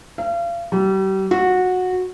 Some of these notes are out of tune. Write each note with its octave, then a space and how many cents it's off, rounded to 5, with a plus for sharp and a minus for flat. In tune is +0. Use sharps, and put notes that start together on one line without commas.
F5 -35
G3 -35
F#4 -15